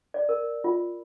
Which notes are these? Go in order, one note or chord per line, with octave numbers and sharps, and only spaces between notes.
D5
A#4
F4